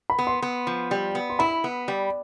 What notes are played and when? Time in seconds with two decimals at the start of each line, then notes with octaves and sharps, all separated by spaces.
0.10 B5
0.19 B3
0.27 C6
0.42 B3
0.67 F3
0.91 G3
1.15 B3
1.30 C6
1.39 E4 B5
1.64 B3
1.88 G3